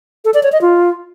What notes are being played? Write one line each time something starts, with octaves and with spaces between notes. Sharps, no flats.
A4
D5
C#5
D#5
F4